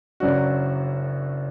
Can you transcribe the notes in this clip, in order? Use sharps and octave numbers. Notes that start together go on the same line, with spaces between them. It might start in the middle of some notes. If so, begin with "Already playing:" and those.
F#1 F#2 F#3 D4 F#4